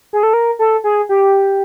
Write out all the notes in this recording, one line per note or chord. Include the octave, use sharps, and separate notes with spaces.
G#4
A4
A#4
A4
G#4
G4